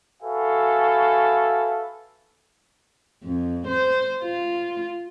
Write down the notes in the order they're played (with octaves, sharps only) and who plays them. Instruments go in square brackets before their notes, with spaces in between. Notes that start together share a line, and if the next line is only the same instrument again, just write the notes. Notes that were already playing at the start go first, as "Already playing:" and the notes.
[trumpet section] F#4 A4 B4 E5 F5 G#5
[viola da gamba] F2
C5
F4